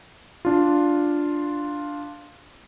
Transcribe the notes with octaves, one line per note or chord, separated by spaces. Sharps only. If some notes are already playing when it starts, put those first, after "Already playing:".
D4 F4